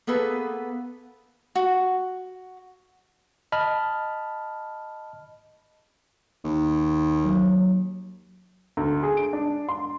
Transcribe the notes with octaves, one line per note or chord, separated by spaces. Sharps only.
A#3 B3 G#4 A4 B4
F#4
D#5 A5 B5 F6
D#2
F#3
D2
G#4
D7
D4
C6